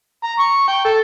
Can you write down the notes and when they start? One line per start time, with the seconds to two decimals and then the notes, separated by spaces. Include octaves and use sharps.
0.24 A#5
0.39 C#6
0.68 G5
0.85 A4